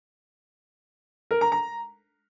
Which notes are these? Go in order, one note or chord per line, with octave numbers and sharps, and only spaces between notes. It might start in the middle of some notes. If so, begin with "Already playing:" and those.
A#4
A#5
A#5